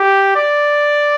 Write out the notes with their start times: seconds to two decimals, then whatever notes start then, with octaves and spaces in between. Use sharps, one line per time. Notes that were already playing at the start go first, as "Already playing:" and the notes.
Already playing: G4
0.36 D5